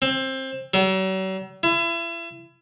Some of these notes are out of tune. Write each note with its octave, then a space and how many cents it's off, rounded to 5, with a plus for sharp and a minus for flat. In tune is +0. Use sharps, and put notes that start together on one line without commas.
C4 +20
F#3 +45
E4 +35